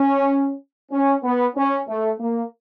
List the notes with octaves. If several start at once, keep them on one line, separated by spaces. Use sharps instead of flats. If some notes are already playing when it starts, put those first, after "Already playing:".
Already playing: C#4
C#4
B3
C#4
A3
A#3